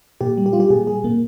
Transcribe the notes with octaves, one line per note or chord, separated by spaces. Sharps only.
A#2 G4
G3
G4
G3 F4
G4
A#2 G#4
G3 G#4
A#2 A#3